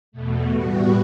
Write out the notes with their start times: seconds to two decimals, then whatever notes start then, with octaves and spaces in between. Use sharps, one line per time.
0.12 E2 B2 A3
0.45 A2 G3 B3 F#4